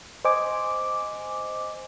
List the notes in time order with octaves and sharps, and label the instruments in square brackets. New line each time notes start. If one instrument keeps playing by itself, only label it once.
[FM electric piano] C5 D#5 G#5 D6